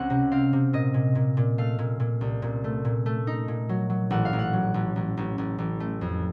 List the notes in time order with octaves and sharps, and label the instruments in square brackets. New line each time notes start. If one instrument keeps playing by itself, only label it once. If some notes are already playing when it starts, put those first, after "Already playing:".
Already playing: [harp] C#2 C4 F#5
C3
C4 F5
C3
A#2 D#5
A#2
A#2
A#2
A3 F5
A#2
A#2
C2
A#2
A3
A#2
A3
D#4
A#2
F#3
F#3
A1 F#5
F5
A1
F#5
F#3
A1
A1
A1
A1
A1
A3
F2